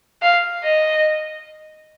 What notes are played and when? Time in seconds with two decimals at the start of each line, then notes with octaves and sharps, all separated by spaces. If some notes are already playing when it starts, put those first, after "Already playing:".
0.22 F5
0.64 D#5